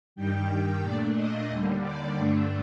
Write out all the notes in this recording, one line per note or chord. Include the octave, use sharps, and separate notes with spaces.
G2 D#3 G3 G5
A#2 A3 D4 D5
D#5
D#2 D3 G3
D5
G2 D3 A3 D4